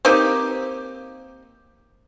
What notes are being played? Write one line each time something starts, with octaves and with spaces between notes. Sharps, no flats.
A#3 C4 D#4 G4